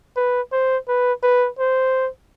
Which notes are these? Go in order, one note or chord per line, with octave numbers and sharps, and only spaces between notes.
B4
C5
B4
B4
C5